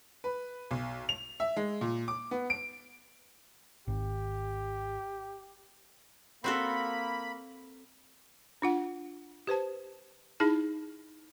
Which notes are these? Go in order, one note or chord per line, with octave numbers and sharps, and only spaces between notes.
B4
B1
F7
E5
G#3
A#2
D6
B3
D7
G#1 G4
A#3 C4 F#4 A4 B5
D4 F4 F#5
G4 B4 C5 A5
D#4 E4 G#4 A5